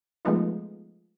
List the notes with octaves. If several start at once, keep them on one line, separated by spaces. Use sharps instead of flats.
F3 G#3 A3 B3 D#4 F4